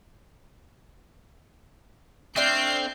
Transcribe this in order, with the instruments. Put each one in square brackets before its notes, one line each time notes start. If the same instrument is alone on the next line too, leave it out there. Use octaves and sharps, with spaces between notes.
[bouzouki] A3 D4 F5 [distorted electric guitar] C4 [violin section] F6 G6 C7